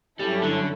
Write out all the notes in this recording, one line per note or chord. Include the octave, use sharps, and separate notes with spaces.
G2 F#3 G3 C#4 E4 A4
D3